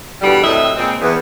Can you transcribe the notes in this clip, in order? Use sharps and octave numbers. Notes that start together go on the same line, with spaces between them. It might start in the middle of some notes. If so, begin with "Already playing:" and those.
E2 B2 D3 G3
A2 F#3 C4 E4 D#5 E5
A#2 C#3 G#3 C4
E2